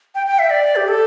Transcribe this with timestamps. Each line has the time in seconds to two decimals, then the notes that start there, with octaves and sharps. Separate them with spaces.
0.15 G5
0.26 G5
0.39 E5
0.50 D5
0.76 G4
0.88 A4